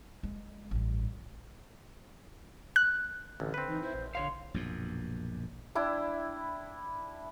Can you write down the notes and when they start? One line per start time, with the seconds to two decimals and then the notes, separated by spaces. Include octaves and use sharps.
0.23 G#3
0.71 A1 G2
2.76 F#6
3.40 A1 D3
3.54 C4 B4
3.68 E3 D#4
3.83 E4 C5
3.94 A#1
4.15 D3 C#5 F5 C6
4.54 A#1 F#2 B2
5.75 D4 E4 G5